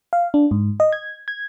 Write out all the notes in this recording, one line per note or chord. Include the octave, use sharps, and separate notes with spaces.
F5
D4
G#2
D#5
G#6
G#6